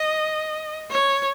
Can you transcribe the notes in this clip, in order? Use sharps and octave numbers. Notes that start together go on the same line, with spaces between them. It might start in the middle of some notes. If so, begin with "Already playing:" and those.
Already playing: D#5
C#5